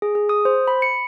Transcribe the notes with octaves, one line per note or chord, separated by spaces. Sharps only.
G#4
G#4
D#6
C5
B5
C#7